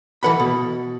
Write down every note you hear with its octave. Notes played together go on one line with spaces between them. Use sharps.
E3 A4 B4 F#5 B5
B2